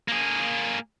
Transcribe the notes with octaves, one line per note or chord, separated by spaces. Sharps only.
A#3 G#4